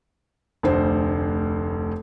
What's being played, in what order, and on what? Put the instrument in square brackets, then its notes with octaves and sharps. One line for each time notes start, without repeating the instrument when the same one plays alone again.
[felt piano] F1 D2 C5